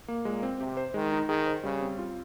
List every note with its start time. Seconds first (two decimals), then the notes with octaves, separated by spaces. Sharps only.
0.08 A#3
0.25 A#2 G#3
0.43 C4
0.60 C3 G4
0.77 C5
0.94 D#3 G#3
1.12 D#4
1.29 D#3 G#4
1.46 C5
1.63 C#3 G3
1.81 C4
1.98 F4